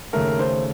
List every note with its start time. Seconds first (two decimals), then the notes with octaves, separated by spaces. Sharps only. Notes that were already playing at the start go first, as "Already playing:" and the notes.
0.13 D#2 C#3 A3 A#4
0.39 C5